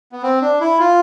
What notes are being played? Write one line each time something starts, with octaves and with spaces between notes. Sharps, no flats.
B3
C4
D4
E4
F4